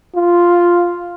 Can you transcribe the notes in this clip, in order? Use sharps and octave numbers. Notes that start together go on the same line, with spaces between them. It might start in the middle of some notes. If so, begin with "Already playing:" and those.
F4